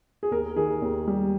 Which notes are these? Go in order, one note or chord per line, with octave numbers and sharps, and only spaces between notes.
G#4
D#2 A#4
D#3 G#4
D#2
G3